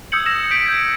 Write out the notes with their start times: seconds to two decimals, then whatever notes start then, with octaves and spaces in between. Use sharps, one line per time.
0.12 D#6 E6 G6 G#6 C#7 F#7
0.26 D#6 E6 A#6 E7
0.51 D#6 G6 B6 D7
0.66 G6 G#6